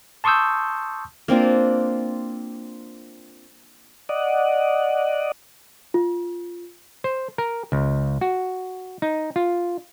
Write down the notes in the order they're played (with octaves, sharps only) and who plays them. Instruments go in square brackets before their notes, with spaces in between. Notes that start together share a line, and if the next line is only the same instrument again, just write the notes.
[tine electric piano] A5 C6 C#6 D#6 E6 G6
[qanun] A#3 C4 D4 F4
[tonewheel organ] D5 D#5 F#5
[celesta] F4
[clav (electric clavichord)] C5
A#4
C#2
F#4
D#4
F4